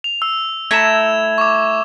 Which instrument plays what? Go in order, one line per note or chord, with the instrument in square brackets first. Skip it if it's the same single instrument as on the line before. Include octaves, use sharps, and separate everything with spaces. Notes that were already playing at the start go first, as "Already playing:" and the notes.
[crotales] F7
E6
[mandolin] A3 E4 A#5 [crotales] G#6 E7
[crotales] C#6 D6